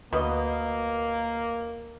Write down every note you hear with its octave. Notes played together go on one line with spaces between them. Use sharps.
D2 B2 A#3 D#5